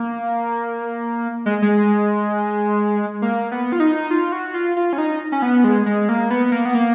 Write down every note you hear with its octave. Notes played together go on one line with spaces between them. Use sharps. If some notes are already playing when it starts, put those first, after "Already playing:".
Already playing: A#3
G#3
G#3
A#3
B3
F4
D#4
F4
F#4
F4
F4
C#4
D#4
C#4
B3
G#3
G#3
A#3
B3
A#3
B3
A#3